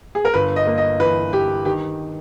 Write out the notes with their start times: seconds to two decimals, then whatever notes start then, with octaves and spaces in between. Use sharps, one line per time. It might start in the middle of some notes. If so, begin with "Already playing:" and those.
0.15 G#4
0.25 A#4
0.34 G1 B4
0.56 D#5
0.67 A#3
0.78 D#5
1.00 E3 B4
1.32 G1 G4
1.65 D#3 G4